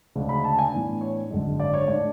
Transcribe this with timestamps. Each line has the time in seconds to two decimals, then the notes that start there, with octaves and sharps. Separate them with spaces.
0.15 D2 C#3 G#3 D4
0.29 B5
0.44 A5
0.59 G#5
0.73 A2 E3 B3 D4
1.01 C#5
1.30 G#1 F#2 D3 G#3
1.60 D5
1.74 C#5
1.88 A2 G#3 D4 D5